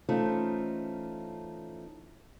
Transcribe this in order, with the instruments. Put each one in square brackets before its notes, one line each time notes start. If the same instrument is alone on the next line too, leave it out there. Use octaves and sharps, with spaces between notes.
[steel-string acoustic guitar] E3 A3 C#4 D#4 F4 C5